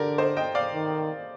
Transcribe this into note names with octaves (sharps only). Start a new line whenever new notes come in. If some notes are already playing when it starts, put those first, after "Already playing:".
Already playing: D3 G4 A#4 D5
C5 D#5
D#5 G5
D5 F5
D#3